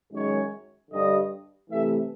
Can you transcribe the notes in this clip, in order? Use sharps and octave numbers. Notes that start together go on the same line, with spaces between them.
F#2 D#3 G#3 C#5
G2 D3 G3 D#5
C3 E3 A3 E5